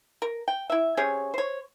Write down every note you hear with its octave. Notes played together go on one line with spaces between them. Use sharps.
A#4
G5
E4 E5
C3 C#4 G#4 C#5
C5 C#5